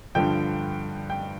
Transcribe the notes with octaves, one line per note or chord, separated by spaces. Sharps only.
G2 D3 F3 G5
G5